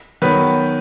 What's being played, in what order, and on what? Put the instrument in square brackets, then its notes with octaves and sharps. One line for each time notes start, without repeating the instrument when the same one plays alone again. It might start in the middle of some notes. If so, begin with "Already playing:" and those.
[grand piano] D#3 F#3 B3 B4